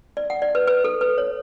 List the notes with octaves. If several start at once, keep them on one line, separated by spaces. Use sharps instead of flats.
D5
F#5
D5
B4
B4
A4
B4
C#5